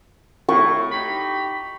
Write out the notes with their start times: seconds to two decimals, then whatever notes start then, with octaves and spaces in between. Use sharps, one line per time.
0.49 A2 C#6
0.91 D#4 G4 B5